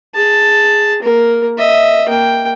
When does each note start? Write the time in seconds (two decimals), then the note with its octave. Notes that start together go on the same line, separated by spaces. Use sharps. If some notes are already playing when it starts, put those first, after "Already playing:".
0.14 G#4 A5
1.02 A#3 A#4
1.58 D#5 E5
2.09 A#3 G5